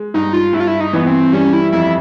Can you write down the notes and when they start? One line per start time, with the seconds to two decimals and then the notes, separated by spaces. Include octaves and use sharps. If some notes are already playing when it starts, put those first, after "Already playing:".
Already playing: G#3
0.14 G2 D#4
0.33 F4
0.53 G2 E4
0.60 F4
0.67 E4
0.80 D#4
0.93 E3 B3
1.07 C4
1.33 G3 C#4
1.53 E4
1.72 F2 E4